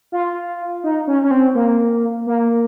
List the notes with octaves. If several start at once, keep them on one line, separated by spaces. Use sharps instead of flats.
F4
D#4
C#4
C#4
C4
A#3
A#3